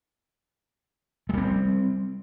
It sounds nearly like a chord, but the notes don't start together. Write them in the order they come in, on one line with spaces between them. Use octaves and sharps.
G#3 G3 C4